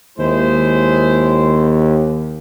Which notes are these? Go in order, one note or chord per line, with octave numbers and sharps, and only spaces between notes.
D#2 G#3 E4 C5